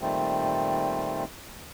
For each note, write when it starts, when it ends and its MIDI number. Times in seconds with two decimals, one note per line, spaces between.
0.01 1.24 46
0.01 1.24 51
0.01 1.24 55
0.01 1.24 57
0.01 1.24 60